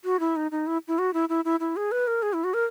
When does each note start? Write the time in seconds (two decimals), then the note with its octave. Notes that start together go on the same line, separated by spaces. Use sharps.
0.05 F#4
0.20 E4
0.36 D#4
0.51 D#4
0.67 E4
0.88 E4
0.99 F#4
1.14 E4
1.29 E4
1.45 E4
1.60 E4
1.76 G#4
1.92 B4
2.07 A#4
2.23 G#4
2.33 E4
2.44 F#4
2.54 A#4